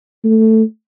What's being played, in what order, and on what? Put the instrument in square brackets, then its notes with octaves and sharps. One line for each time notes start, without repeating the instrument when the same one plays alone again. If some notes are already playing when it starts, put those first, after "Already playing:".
[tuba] A3